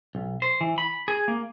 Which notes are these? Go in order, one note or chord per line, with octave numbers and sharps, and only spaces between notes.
B1
C5
E3
B5
G#4
A#3